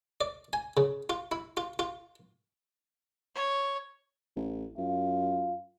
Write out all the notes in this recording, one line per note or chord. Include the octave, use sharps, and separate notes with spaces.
D5
G#5
C#3
F4
E4
F4
F4
C#5
A1
F#2 F4